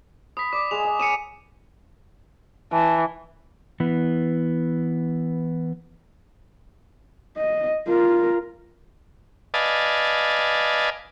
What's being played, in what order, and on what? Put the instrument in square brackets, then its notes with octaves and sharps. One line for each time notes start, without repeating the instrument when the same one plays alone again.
[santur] B5 [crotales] D#6 B6
[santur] D5 [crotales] D6
[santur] G#3 G#4 F5 [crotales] F7
[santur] D#5
[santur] C#4 D#6 [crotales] C#7 D#7 E7
[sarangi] E3 [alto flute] A5
[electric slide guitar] E3 B3
[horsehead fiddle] D#5
F4 A#4
[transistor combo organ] B4 D5 D#5 F5 G#5 A5